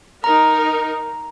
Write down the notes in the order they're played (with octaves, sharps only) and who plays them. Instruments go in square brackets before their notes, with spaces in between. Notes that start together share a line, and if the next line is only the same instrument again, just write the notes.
[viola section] D#4 A#4 [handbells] A#5